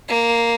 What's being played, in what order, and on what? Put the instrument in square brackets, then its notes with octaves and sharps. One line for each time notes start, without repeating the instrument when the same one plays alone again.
[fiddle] A#3